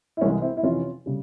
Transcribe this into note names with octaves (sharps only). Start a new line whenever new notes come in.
E4
C2 C3 E3 G#3 C#4
C4 E4
E4
F2 C3 E3 C#4 F4
C#3 G3